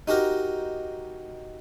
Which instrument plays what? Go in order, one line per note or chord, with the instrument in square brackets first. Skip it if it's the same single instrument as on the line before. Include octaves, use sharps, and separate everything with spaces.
[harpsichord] D#4 F#4 G4 A#4